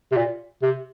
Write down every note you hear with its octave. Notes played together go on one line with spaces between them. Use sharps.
C3
A#2
C3